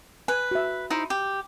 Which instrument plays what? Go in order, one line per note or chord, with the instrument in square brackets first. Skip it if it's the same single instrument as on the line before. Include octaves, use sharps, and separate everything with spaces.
[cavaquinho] B4 [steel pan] G#5
[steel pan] F#4 E5
[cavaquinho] D#4 E4 C5
G4